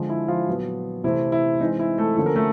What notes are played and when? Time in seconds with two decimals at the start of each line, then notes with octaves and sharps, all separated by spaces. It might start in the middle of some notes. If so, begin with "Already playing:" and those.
Already playing: D3 F3 G#3
0.09 E4
0.28 F3 F4
0.47 A#2 F#3 B3
1.04 C3 E3 A3 C4 E4
1.32 E4
1.60 E3 G#3 C4 D#4
1.79 E4
1.98 A3 A4
2.17 D3 F3 A#3 C#4 A4
2.26 A#4
2.35 A3 A4